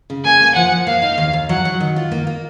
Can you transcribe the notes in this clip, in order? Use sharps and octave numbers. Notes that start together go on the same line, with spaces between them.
C#3
A#3 G#5
A#3
F3 F#5
F3
A#3 F5
D#4
D#2
D#2
F#3 F#5
F#3
D#3
F4
A#3
A#3